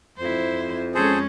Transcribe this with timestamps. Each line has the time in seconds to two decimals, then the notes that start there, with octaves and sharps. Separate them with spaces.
0.18 F2 E4 C5
0.95 G#3 C#4 G#4 A4 C5